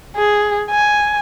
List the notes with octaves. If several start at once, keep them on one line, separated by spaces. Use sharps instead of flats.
G#4
G#5